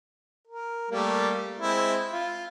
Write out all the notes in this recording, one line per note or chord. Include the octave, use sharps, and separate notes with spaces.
A#4
G3 A3 A#3
G#3 C4 E4
F4